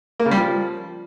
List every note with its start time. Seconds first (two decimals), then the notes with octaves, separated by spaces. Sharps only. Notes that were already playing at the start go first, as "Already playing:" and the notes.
0.20 A#3
0.25 C#3
0.31 G3
0.37 F3